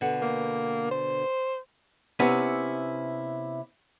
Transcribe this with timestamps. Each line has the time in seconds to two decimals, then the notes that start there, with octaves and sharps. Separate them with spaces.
0.01 B2 D3 F#5
0.22 A#3
0.91 C5
2.20 C3 B3 C#4 E4